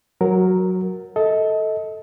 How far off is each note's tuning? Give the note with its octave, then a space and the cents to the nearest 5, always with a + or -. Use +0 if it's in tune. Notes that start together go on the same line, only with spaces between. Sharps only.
F#3 +0 A#4 +0
A4 +0 D#5 +30